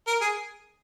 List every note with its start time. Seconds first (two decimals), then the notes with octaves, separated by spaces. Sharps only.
0.07 A#4
0.22 G#4